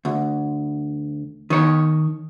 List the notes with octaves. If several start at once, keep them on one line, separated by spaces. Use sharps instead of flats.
D2
D#3 C#5